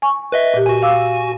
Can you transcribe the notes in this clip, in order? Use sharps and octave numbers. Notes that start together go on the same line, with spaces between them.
G#5 C#6
B4 D#5 E5
A#2 G4
F#4 G#5
F5 D6 E6